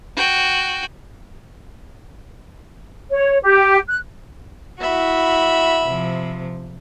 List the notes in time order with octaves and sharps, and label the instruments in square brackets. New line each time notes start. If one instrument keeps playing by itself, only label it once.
[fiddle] F#4 G5
[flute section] C#5
G4
F#6
[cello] E4 F#4 [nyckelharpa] E5 B5
[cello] C3 F3